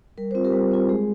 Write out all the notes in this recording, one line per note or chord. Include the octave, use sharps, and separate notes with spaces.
G3 A#4
C4 F4 C5
G4 A#4
G3
C4 F4
G#3 G#4